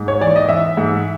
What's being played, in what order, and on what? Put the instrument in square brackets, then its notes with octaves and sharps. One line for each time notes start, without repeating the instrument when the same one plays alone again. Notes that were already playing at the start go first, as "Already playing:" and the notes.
Already playing: [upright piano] G#2
C#5
E3 D5
D#5
E3 E5
G#2